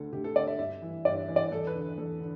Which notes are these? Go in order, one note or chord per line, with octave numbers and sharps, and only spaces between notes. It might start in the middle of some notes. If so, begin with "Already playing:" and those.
Already playing: D2 D3 A4
D2 G4
A4
D3 D5
E5
G2 E5
E3
G2 D5
E5
E3
D5
E2 A4
B4
D3
E2 A4
D3